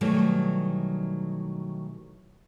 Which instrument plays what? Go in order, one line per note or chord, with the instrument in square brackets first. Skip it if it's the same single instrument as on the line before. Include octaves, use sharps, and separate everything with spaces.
[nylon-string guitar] B2 D#3 E3 F#3 G3 A3